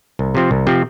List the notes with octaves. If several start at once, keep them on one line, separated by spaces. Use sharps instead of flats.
C2
C3 F3 C4
C2
C3 F3 C4